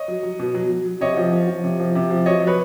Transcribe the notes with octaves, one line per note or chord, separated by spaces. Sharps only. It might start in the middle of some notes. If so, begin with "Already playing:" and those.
Already playing: C#5 D#5
F#3
F#3
B2
F#3
F#3
F#3
C3 C#5 D#5
F3
F3
F3
C3
F3
C3
F3
F#3 C#5 D#5
F#3
B4 C#5